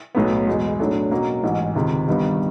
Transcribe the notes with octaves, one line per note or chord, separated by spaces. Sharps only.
B1 A2 F#3 B3
E1 E2 B2 G#3
A2 F#3 A3 D4
B2 F#3 A#3 C#4
A1 G#2 E3
C#2 C3 D#3
G2 D#3 G3 B3